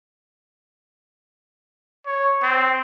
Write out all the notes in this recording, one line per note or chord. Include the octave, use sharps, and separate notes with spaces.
C#5
C4